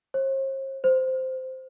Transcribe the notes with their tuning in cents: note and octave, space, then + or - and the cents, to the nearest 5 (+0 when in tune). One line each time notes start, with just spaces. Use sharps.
C5 +45
C5 -10